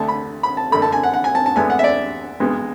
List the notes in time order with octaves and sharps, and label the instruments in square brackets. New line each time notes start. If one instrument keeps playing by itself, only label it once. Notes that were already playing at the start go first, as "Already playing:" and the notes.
Already playing: [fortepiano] D2 D3 A3 A5
B5
B5
A5
F#2 D3 A3 B5
A5
G#5
F#5
F#5
G#5
A5
A5
D2 D3 G#3 B3 G#5
F#5
E5
D5
B1 B2 G#3 B3